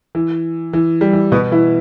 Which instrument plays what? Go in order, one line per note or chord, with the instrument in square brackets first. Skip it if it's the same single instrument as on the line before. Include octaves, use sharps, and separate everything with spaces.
[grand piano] E3
E3
G3
E3
B2 B3
E3 E4